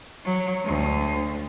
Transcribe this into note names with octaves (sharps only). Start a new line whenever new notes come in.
F#3
D2